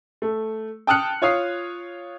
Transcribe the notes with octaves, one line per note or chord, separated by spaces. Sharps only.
A3
G5 A5 D#6 F6 F#6 C#7
F4 C#5 F5 D#6 C7